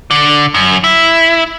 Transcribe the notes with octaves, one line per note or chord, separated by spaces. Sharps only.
D3
F#2
E4